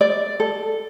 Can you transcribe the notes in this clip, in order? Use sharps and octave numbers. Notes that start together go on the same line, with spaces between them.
D5
A4